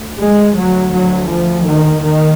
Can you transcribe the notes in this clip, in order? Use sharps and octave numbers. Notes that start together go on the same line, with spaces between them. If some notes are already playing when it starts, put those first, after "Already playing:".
Already playing: D2
G#3
D2 F#3
F#3
F3
D#3
D#2 D#3